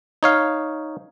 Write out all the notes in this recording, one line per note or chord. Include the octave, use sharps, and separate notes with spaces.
D#4 C#5 F5